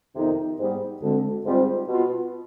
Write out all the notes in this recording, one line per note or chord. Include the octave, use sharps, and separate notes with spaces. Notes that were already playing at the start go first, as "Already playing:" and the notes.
F2 C3 D#3 B3 D#4
G#2 G3 B3
D2 D3 G#3 C4
G#2 G3 C4 F4
B2 B3 F4